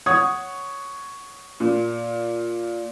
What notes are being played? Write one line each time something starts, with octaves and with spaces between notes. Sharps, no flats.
C#5 F#5 C#6 D#6 G#6
A#2